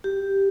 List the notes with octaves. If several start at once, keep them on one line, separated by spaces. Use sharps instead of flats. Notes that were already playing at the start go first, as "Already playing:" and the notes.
G4